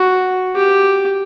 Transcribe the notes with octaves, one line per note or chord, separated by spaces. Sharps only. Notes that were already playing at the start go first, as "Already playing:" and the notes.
Already playing: F#4
G4